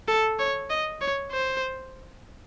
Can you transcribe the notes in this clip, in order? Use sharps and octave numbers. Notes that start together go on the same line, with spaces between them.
A4
C#5
D#5
C#5
C5